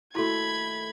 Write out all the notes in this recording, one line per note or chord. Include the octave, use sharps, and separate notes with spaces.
D#2 A3 E4 F#4 B5 C6 G#6